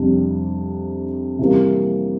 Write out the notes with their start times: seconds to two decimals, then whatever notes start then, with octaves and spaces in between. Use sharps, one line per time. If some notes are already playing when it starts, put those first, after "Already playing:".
Already playing: F2 C3 G3 D4
1.39 C3 E3 G3 A#3